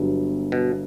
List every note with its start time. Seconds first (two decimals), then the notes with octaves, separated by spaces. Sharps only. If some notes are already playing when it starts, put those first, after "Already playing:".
Already playing: G1 G2 F#3 B3
0.52 B2